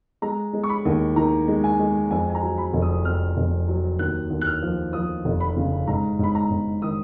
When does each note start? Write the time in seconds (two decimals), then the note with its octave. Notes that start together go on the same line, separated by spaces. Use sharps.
0.22 G#3 A#5
0.53 G#3
0.64 C#6
0.69 B5
0.85 D#2
1.16 D#3 A#5
1.48 G#3
1.64 G#5
1.79 G#3
2.11 F2 G#5
2.30 G#5
2.35 A#5
2.42 F#3
2.58 B5
2.73 F1
2.82 D#6
3.05 F2 F6
3.37 F1
3.68 F#3
3.99 D#2 F#6
4.30 D#2
4.41 F#6
4.47 F6
4.62 F3
4.93 F3 D#6
5.25 F1
5.40 B5
5.56 C#3
5.88 G#2 A#5
6.19 G#2 B5
6.35 A#5
6.50 G#2
6.82 D#3 D#6